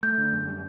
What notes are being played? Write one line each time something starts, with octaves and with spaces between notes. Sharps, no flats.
A3 G6
D3
F#2
G3